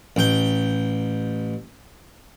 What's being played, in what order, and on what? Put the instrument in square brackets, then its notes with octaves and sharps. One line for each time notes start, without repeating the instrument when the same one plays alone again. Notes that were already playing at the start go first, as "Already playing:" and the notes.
[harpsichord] A1 G5